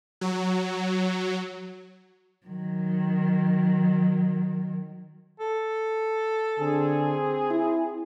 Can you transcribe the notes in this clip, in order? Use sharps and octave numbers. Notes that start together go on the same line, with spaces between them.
F#3
D#3 F#3
A4
D3 C4 G#4
E4